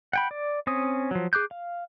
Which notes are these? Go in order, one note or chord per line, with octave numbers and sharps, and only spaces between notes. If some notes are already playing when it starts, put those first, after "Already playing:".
F#5 G5 B5
D5
C4 C#4 D#6
F3 F#3
G#4 D6 F#6 G6
F5